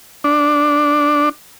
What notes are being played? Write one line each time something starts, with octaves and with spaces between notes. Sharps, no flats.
D4